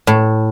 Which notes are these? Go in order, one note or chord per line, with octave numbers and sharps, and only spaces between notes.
A2